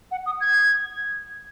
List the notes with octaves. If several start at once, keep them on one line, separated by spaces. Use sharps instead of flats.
F#5
D#6
G#6